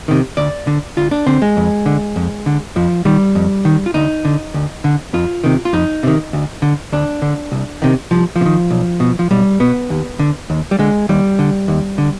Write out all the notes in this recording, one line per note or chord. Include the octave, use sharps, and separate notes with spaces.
C3 D#3
D2 D5
D3
D2 F4
D4
D3 C4
G#3
F2
D3
F2
D3
F2 F3
D#3 G3
F2
D#3
F4
D2 D#4
D3
D2
D3
F2 F4
C3 D#3
F4
F2 D#4
C3 D#3
D2
D3
D2 D4
D3
C2
C3 D#3
C2 F3
F3
C3
D#3
B1
B2
F3
B1 G3
B2 B3
D#2
D3
D#2
G3
D3 G#3
D#2 G3
D3
D#2
D3